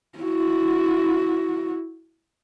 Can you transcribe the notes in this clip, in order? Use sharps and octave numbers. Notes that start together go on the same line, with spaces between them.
E4 F#4